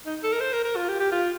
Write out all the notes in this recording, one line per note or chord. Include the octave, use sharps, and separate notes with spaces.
D#4
A4
A#4
C5
A#4
A#4
F4
G4
G4
F4